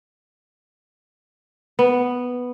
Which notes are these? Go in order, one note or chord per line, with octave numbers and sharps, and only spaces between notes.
B3